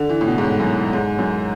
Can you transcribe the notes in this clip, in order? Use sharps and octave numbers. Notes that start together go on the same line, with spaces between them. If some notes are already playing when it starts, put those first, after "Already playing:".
Already playing: D3
E3
A2
B2
G#2
A2
F#2
G#2
F#2